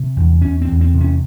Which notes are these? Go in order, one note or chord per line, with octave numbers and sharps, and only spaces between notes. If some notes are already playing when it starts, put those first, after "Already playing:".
Already playing: C3
E2
E2 C#4
C4
E2
C4
C3
C#4